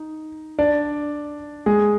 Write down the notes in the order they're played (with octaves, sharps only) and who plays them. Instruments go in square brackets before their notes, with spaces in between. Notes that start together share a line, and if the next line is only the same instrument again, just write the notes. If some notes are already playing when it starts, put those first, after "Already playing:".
Already playing: [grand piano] D#4
D4 D5
G#3 G#4